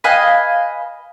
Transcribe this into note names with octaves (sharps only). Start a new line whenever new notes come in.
B4 D#5 F5 G#5